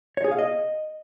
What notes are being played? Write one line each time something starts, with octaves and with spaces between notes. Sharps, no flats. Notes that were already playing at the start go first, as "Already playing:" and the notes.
C#5
G#4
F5
D#5